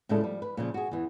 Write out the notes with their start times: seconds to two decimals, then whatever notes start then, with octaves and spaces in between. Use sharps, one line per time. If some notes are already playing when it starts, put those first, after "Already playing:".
0.09 A2 C#3 G#3 D4 F4 A4
0.21 F3 G3
0.42 B4
0.57 A#2 C#3 F3
0.74 F#4 G#4
0.91 E2 E3